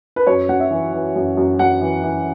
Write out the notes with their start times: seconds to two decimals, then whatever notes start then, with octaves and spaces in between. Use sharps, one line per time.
0.16 B4
0.27 F#2 C#5
0.49 F#2 F#5
0.60 E5
0.71 E3
0.93 E3
1.16 F#2
1.37 F#2
1.59 F#2 F#5
1.81 E3
2.03 E3